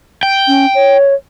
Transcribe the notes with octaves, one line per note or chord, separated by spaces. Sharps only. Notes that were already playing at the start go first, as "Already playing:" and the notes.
G5
C#4
C#5